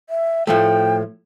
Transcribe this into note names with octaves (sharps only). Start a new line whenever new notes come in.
E5
A2 F3 A3 G5